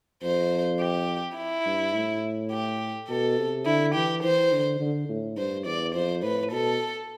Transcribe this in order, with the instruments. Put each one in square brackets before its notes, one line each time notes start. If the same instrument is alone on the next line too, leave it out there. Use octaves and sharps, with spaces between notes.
[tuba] F2 [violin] C5
[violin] G4
E4
[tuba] G2
A2
[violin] G4
[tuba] B2 [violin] A4
[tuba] C3
[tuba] D3 [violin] E4
[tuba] E3 [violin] G4
[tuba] E3 [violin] C5
[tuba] D3
D3
A2
[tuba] G2 [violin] C5
[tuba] E2 [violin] D5
[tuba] F2 [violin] C5
[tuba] A2 [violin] B4
[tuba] B2 [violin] A4